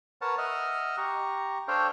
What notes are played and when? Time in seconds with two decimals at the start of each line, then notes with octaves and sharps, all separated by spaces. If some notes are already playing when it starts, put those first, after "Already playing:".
0.21 A#4 B4 C#5 F#5 A5
0.38 D#5 E5 F#5 F6
0.97 G4 A#5 C#6
1.68 D4 A4 C5 C#5 F5 G5